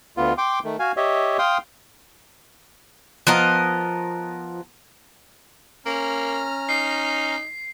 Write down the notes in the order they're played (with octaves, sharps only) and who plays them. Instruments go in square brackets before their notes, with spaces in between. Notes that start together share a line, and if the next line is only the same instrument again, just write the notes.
[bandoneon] D2 B3 F4
G5 C6 D6
D#3 A3
F#4 F5 G#5
G4 C#5 D#5 E5
F5 G5 C6 D#6
[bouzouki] F3 B3 A#4 D#5
[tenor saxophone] A#3 [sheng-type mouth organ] C#4 A#5 F6
[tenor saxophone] D#4 [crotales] C7